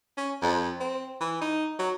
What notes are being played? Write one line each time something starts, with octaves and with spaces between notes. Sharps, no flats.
C#4
F2
C4
E3
D#4
F#3